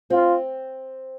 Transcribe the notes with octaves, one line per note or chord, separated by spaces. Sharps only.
C4 F4